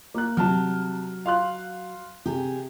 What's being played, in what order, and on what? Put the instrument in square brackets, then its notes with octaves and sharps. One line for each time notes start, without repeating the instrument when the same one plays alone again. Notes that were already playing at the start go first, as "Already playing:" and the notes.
[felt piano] A#3 F#6
[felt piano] C3 A5 F6 [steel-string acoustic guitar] F#3
[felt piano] F5 C6 F#6
[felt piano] C3 [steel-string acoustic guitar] G4 G#4